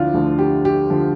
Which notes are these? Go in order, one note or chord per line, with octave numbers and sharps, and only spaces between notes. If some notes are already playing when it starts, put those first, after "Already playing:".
Already playing: D2 D3 F3 D4 E4 F4
D2 D3 F3
G4
G4
D3 F3